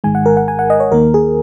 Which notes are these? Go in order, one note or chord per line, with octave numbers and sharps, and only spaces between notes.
G#1 G#2 D#3 G#3 G#5
F#5
A#4
F#5
G#5
F#5
D#5
C#5
D#2 D#3 A#3 A#4
G#4